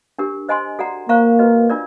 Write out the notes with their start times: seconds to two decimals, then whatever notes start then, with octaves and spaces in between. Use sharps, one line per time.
0.18 D4 G4 A#4
0.49 C5 D#5 G#5 C6
0.79 F#4 A4 D5 F#5 A#5
1.09 A#3 C5 F5 A#5 C#6
1.39 F#4 B4 D#5
1.70 D4 F4 A#4 D5